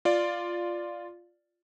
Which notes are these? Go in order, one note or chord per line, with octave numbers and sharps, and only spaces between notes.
F4 D5